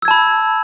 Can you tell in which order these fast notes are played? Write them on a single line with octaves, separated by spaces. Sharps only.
E6 G#6 A5 B5